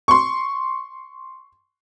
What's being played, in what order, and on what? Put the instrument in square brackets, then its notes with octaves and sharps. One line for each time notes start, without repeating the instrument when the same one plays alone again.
[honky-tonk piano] C6 C#6